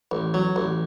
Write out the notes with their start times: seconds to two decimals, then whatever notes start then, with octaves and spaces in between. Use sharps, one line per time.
0.11 A1
0.34 F#3
0.56 A1